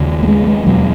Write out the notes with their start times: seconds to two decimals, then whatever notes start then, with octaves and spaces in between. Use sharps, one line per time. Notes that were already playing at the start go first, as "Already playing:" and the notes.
Already playing: D#2 C#3
0.23 A#3
0.28 G#3
0.47 G#3
0.67 E2 B2 F#3